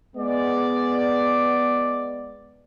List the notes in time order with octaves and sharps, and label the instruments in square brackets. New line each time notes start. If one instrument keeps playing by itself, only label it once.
[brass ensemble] G#3 B3 D5